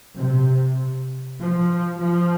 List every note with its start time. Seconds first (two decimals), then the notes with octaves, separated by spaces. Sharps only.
0.16 C3
1.41 F3
2.03 F3